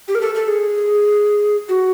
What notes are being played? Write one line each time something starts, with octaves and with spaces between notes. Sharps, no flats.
G4
A#4
A4
A4
G#4
F#4